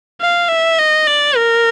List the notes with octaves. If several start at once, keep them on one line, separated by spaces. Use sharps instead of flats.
F5
E5
D#5
D5
A#4